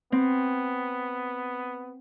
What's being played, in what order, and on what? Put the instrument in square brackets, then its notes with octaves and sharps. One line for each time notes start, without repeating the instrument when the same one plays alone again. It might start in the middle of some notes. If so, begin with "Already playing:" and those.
[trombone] B3 [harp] C4